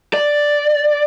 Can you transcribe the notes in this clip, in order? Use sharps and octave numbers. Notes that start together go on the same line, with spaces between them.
D5